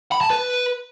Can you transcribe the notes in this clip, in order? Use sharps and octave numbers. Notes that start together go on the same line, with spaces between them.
B5
A5
B4